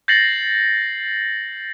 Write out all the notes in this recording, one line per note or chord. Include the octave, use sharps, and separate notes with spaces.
G6 A6 A#6 C7 C#7 F#7